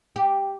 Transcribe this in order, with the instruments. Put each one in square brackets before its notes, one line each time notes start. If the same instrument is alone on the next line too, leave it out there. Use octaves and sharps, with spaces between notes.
[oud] G4